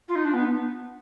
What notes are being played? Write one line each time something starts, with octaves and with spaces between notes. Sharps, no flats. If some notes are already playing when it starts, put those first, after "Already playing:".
F4
D#4
D4
B3